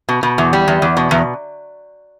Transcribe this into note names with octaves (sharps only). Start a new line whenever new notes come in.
B2
B2
E2
G3
E2
E2
B2
E2